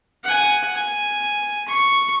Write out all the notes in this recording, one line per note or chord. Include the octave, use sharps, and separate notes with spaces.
F#5 G#5
G#5
C#6